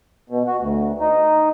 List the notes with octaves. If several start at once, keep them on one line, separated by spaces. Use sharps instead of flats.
B2
F#4
D2
D#4